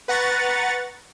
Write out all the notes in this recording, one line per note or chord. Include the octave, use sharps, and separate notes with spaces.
B4 F#5 A#5 C#6 A6